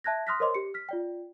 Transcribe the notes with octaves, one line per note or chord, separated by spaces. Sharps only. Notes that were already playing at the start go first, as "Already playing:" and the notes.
E5 A5 F#6 G#6 A#6
C6 D#6 F6 F#6 A#6 B6
A#4 C5 C#5 D#5 C6 D6
G4 C#7
F6 B6
F4 D5 G5